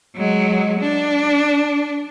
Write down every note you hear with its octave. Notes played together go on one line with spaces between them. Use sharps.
F#3 G#3
D4